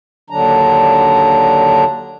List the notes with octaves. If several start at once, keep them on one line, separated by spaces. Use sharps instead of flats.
D#2 D3 F#3 D4 A#5